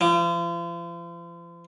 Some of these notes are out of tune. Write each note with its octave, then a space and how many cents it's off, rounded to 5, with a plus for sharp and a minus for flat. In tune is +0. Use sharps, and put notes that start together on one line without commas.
F3 -40